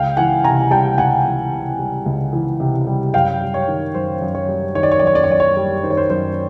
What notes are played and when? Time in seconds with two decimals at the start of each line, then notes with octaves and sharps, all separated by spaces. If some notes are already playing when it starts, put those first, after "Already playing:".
Already playing: C#2 F5 G5
0.17 E3 F#5 G#5
0.44 C3 G#5 A#5
0.71 G3 G5 A5
0.98 C#2 F#5 G#5
1.25 E3
1.52 C3
1.79 G3
2.06 C#2
2.33 E3
2.60 C3
2.87 G3
3.14 F#2 F5 G5
3.41 G3
3.54 C#5
3.68 D#3
3.94 F#2 C5
4.22 F#2
4.35 C#5
4.49 G3
4.75 D#3 C#5
4.83 D5
4.92 C#5
4.99 F#2 D5
5.07 C#5
5.15 D5
5.24 C#5
5.29 F#2 D5
5.40 C#5
5.57 G3
5.83 D#3 C5
5.91 C#5
5.97 C5
6.10 F#2 C5